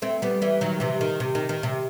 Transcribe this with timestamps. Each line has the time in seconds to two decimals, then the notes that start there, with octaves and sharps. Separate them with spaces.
0.02 A3 C4
0.22 G3 B3
0.42 E3 G3
0.61 D#3 F#3
0.80 C3 E3
1.01 D#3
1.20 C3
1.35 D#3
1.49 D#3
1.63 C3